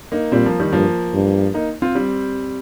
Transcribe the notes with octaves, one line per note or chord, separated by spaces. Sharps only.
A#3 D#4
A#2 G3 C4
F3 A#3
D#3 G3
G2 F3 A#3
G2
A#3 D#4
C4 F4
G3 C4